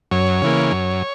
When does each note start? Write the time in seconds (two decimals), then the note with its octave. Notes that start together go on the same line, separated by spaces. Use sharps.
0.11 F#2 C#5
0.42 C#3 E3 A#3
0.72 F#2